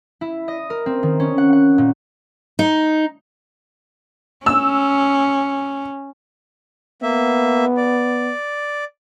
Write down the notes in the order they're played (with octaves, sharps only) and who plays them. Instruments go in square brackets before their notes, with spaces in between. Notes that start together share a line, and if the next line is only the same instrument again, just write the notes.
[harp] E4
D#5
A#4
C4
D#3
C#4
F#5
F#5
A#2
[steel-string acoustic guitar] D#4
[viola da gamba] C#4 [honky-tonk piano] E6
[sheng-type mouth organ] A#3 E5 [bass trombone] B3
[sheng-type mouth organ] D5